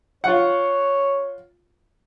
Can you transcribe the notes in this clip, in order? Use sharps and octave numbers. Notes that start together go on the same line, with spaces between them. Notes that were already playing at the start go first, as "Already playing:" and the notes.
F4 C#5 F#5